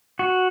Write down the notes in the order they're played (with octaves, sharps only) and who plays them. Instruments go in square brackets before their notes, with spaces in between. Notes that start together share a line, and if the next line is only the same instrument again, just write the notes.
[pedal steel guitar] F#4